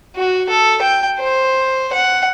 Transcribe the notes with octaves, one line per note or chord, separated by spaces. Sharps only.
F#4
A4
G5
C5
F#5